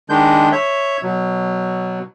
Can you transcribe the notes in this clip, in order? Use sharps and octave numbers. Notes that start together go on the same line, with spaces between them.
D#3 G#3 D4 G6
C#5 E5
B2 F#3